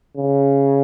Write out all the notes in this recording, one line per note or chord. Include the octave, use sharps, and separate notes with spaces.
C#3